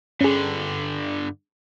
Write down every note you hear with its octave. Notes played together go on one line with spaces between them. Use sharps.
G2 D3 C#4 G#4